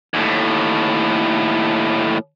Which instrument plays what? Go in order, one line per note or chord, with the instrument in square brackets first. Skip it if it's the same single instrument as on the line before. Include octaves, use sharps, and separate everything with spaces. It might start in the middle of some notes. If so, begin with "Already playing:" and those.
[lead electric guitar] D#2 A2